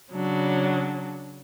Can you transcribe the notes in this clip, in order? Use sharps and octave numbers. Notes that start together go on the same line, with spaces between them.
C#3 F#3 D4